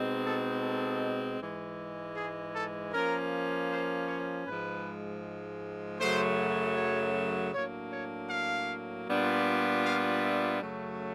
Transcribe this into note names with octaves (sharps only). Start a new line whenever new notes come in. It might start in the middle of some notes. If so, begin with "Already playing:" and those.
Already playing: B2 G#3 C4 D#4
A4
A4
G#2 E3 G#3
G#4
A4
F3 A#3 C#4 A#4
C5
C#5
G#2 F3 G#3 B4
F#2 C#3 F#3 A3 C5
C#5
A2 F#3 A#3 D4 C#5
C#5
F5
A#2 G3 B3 D4 F4
F5
E5
F#2 C#3 F#3 A3